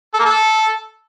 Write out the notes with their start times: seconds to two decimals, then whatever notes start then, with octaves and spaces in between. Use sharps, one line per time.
0.14 A4
0.20 A#3
0.25 A4